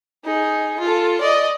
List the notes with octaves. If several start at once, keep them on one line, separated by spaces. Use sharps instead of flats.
D#4 G#4
F4 A4
D5 D#5